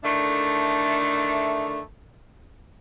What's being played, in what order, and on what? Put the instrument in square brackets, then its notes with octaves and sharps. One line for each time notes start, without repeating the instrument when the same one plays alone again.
[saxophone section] D3 D#3 A3 D4 E4